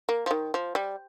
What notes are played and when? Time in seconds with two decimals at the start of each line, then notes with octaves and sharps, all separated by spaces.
0.09 A#3
0.26 F3
0.31 D#3
0.54 F3
0.75 G3